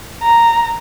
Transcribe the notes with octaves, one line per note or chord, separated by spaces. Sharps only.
A#5